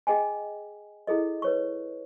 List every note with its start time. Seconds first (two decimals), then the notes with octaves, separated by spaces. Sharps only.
0.07 G#4 D#5 G5 G#5
1.07 E4 G#4 A4 D#5
1.42 B4 C#5 C#6